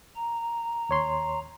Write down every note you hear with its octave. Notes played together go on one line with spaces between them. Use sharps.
A#5
D#2 C#5 C6